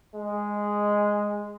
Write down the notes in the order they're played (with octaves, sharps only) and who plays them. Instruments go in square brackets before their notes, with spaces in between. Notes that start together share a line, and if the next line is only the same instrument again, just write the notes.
[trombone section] G#3